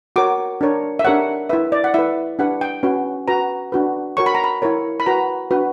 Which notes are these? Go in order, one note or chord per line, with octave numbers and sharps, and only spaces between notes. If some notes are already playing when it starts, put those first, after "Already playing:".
F#4 A#4 C#5 D6
D4 A#4 C#5
E5
D4 G4 A#4 C#5 F#5
E4 B4 E5
D5
F#5
E4 B4 E5
D4 G4 B4 F#5
G5
C#4 F#4 B4
F#4 B4 A#5
D4 F#4 B4
F#4 A#4 C#5 C#6
B5
A#5
B5
E4 A#4 C#5
B5
F#4 B4 A#5
D4 F#4 B4